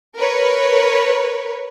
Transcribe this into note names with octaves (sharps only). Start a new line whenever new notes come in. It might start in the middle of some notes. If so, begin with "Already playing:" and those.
A#4 B4 C#5